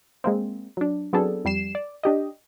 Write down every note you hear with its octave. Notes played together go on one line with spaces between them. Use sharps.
G#3 A#3 C4
F#3 D4
F#3 B3 C4 D4 G#4 A4
F2 G3 C7 E7
D5
D4 G4 D#5